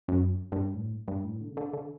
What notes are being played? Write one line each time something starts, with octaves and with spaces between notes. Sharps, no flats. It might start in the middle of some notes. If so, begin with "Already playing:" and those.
F#2
G2
A2
G2
A2
D3
C#3
D3
D3